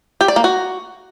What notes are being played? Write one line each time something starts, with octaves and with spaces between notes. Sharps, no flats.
G4
D5
A#3
F#4